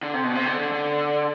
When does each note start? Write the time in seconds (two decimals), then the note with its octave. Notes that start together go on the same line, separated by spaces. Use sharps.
0.03 D3
0.14 C3
0.24 B2
0.35 C3
0.46 D3
0.59 D3
0.73 D3